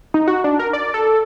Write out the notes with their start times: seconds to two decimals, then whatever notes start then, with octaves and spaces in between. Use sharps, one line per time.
0.14 D#4
0.28 F#4
0.44 D4
0.59 A#4
0.73 D5
0.94 A4